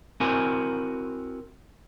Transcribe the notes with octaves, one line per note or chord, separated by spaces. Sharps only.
C4 E4 F#4 A#4 G#5